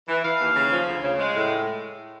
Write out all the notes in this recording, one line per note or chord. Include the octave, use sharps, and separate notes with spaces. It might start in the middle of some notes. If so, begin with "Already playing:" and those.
E3
E3 F5
D#2
C#3
F3
D2
C#3
G#3
A2